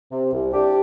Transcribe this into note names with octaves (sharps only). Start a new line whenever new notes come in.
C3
C2
C2 D4 G4